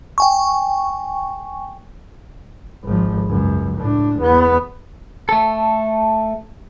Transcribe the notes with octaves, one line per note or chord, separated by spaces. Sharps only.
G5 G#5 C#6
G#1 F3
C#2 F#2
A2 D4
E2 B3
A3 A4